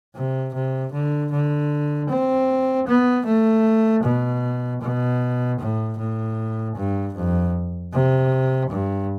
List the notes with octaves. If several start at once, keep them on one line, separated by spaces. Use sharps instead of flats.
C3
C3
D3
D3
C4
B3
A3
B2
B2
A2
A2
G2
F2
C3
G2